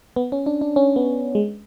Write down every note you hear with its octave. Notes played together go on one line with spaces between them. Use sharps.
B3
C#4
D4
D4
C#4
B3
G#3